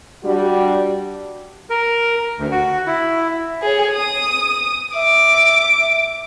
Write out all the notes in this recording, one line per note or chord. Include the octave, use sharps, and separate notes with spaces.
G3 D4 F#4
A#4
D2
F#4
E4
G#4 C#5
D#6
E5 D6